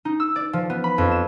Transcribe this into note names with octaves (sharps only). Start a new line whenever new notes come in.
D#4
E6
D5
F3
B3
B5
F2
E7